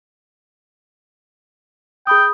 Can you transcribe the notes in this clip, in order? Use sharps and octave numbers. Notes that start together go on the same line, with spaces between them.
G#4 G5 B5 D#6